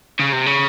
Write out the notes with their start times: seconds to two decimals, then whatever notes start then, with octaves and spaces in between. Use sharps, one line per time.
0.19 C#3
0.32 C3
0.46 C#3